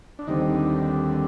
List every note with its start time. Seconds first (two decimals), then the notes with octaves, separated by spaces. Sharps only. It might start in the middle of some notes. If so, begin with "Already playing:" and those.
0.19 D4
0.27 D#2 D3 G3 C4 D#4